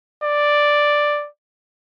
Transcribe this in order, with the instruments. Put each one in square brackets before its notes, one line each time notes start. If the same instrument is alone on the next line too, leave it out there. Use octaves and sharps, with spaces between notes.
[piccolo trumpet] D5